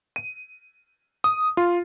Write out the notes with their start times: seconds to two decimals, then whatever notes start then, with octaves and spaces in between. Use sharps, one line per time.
0.16 D#7
1.24 D#6
1.57 F4